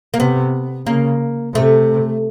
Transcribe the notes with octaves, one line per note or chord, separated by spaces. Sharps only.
A#3
C3 B3
C#3 A#3
C3 A3